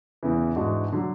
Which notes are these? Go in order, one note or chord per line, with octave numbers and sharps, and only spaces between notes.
E2 C#3 E3
G#2 E3 G#3 D4 F#4
D3 F#3